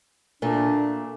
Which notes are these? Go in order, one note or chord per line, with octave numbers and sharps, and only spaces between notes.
A#2 A3 D4